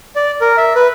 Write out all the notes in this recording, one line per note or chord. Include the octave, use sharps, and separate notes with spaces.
D5
A#4
E5
B4